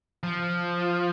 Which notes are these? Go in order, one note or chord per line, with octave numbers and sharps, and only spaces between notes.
F3